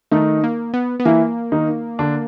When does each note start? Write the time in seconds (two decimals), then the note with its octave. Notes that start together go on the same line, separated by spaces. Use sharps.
0.11 D#3 A3 D#4
0.44 A#3
0.74 B3
1.00 B3
1.05 E3 A#3 E4
1.52 D#3 D#4
1.99 D3 D4